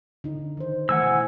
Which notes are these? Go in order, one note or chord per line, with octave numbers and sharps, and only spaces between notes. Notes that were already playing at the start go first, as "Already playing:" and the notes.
D3 D#4
D#3 C5
E3 A3 C5 F#5 G#5 E6
B2